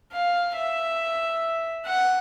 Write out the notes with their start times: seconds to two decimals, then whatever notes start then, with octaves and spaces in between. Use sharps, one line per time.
0.13 F5
0.56 E5
1.86 F#5